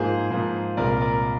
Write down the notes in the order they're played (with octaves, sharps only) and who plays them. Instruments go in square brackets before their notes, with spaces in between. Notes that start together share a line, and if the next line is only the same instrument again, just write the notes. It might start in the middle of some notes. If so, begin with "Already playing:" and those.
Already playing: [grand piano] G#2 F3 A#3 F4 G#4 C5
G#2 F3 A#3 F4
C2 A#2 G#3 A#4 D5
A#4 D5